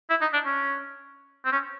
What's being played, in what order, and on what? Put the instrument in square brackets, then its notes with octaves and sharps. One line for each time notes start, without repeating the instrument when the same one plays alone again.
[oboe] E4
D#4
D4
C#4
C4
C#4